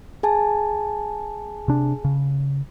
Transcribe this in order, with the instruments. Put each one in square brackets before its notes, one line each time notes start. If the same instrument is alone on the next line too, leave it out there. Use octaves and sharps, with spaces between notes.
[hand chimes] G#4 G#5 A5
[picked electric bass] C3 D4
C#3